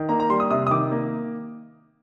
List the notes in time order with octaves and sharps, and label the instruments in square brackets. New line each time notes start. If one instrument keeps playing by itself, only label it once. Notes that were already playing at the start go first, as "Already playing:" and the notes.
Already playing: [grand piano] D#3
A#3 A#5
A#5
G3 C6
D#6
C3 D#6
D#6
D#3 D6
A#3